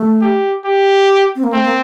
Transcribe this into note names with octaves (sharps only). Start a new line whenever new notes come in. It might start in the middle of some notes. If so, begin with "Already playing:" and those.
Already playing: A3
G4
G4
C4
A#3
A3 C4
A#3